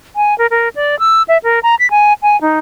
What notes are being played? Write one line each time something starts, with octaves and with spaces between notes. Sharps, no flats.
G#5
A#4
A#4
D5
E6
E5
A#4
A#5
B6
G#5
G#5
D#4